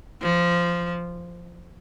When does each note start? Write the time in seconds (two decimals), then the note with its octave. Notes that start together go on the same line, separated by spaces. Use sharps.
0.22 F3